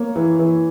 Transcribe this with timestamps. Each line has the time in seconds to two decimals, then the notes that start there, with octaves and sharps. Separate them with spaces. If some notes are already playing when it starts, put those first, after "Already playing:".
Already playing: A#3 C#5
0.16 E3
0.39 E3